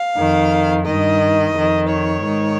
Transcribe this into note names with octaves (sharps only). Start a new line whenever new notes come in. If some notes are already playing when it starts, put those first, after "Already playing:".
Already playing: F5
F2 D#3
G2 D#3 D#5
F2 D#3
C#5
G#2 D#3